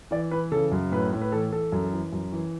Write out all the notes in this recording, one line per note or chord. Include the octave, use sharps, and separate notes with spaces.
E3 D5
E3 B4
C#3 A4
F#2
A2 B4
A2
B4
E3 A4
E3 A4
F#2
E3
F#2
E3